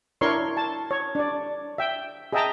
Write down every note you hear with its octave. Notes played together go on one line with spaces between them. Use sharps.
D4 E4 A#4 C#5 C6 C#6
A5
C#5
D4 D5
E5 G5
G#4 D#5 E5 G5 A5 A#5